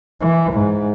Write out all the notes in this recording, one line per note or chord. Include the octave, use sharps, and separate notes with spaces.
E3
G#2